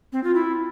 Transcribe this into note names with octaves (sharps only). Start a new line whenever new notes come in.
C4
F4
E4